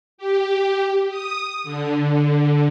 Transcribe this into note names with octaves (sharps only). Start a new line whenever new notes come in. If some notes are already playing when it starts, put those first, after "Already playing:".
G4
D#6
D3